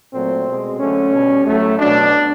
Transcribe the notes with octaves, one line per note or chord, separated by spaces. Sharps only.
A#2 F#3 A3 C4
B2 G#3
D3 F#3 A3 C#4
B2 G3
A2 F#3 A3
B2 F#3 A3 D4